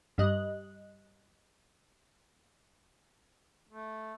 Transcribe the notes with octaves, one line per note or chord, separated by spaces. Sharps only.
G2 G3 D#5 F#6
A3